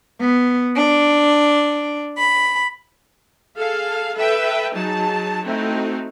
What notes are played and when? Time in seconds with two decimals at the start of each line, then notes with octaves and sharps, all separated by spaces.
0.20 B3
0.77 D4
2.17 B5
3.58 G#4 A4 F5
4.15 A4 B4 E5 G5
4.74 F#3 D#4 G#4 A5
5.45 A3 C4 D#4 E4 F#4